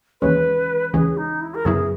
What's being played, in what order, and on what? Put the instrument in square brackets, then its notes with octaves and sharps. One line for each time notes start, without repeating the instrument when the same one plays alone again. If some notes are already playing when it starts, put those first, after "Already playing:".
[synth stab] D#2 C#3 E3 G#3 C#4 [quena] B4
[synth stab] D#2 C#3 E3 G#3 C#4 [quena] G#4
[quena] D#4
E4
A#4
[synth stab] F#2 C#3 F#3 B3 E4 [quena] G#4